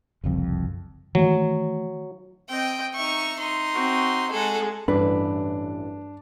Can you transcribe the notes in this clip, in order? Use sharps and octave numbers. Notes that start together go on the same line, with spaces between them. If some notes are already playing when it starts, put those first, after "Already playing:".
F#1 C2 F2
D#3 E3 F#3 A3
C4 D#5 G5
D#4 E5 C#6
D#4 C6
C4 F#4
G#3 G#4 A4 F#5
A1 G2 E3 D4 B4